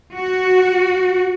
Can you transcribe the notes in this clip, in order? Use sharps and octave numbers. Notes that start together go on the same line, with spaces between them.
F#4